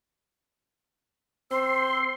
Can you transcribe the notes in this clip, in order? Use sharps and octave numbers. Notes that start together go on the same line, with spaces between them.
C4 C5 C6 E6